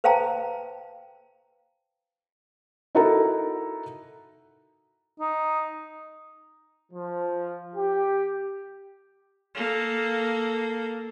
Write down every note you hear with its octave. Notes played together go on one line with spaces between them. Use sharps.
B4 C5 F5 G5 A5 A#5
D#4 E4 F#4 A4 A#4 A#5
D#4
F3
G4
A#3 A4